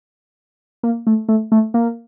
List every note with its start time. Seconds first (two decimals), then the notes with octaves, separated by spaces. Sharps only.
0.83 A#3
1.07 A3
1.29 A3
1.52 A3
1.74 A#3